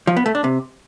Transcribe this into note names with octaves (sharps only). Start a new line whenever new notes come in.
F3
B3
A3
D4
C3